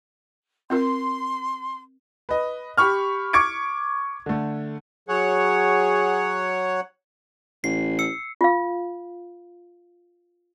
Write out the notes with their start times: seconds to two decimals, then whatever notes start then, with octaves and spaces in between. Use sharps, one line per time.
0.70 C4 F4 A#4 C6
2.29 B4 D#5
2.78 G4 B5 C#6 F6
3.33 C#6 D6 G#6 C#7 D7
4.26 D3 A3
5.09 F#3 G#4 C#5 F#5
7.64 A1 C7
7.99 E6 C#7
8.41 F4 F5